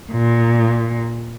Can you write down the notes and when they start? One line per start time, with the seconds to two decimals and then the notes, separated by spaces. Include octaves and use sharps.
0.11 A#2